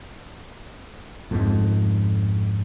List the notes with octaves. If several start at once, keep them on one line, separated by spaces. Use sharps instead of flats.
F2 G#2